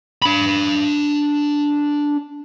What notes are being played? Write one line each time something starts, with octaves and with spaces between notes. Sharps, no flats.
D4 B5